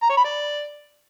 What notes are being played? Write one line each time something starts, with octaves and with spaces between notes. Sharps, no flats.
A#5
C#5
B5
D5